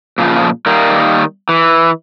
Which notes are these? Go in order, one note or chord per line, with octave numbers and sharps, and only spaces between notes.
A#2 C#3 F3
D#3 G3 A#3
E3